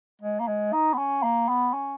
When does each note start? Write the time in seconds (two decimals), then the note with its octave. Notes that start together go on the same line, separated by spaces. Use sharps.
0.22 G#3
0.40 A#3
0.47 G#3
0.73 D#4
0.94 B3
0.98 C#4
1.23 A#3
1.48 B3
1.73 C#4